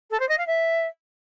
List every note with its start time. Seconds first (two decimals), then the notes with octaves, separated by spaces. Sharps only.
0.10 A4
0.20 C5
0.29 D#5
0.38 F5
0.47 E5